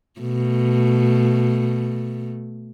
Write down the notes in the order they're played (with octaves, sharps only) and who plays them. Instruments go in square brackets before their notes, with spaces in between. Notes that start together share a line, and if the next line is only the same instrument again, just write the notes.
[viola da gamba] B2 A3